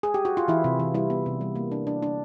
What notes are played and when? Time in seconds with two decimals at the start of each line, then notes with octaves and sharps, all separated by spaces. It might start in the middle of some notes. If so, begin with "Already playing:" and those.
0.03 G#4
0.14 G4
0.25 F#4
0.37 F4
0.48 E3 E4
0.64 C3
0.80 E3
0.94 G3 E4
1.10 B3
1.26 C3
1.41 G3
1.56 A#3
1.72 D4
1.87 D4
2.03 D4